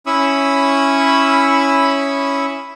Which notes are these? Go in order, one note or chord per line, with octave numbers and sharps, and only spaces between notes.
C#4 E4 B5 C#6 D#6 E6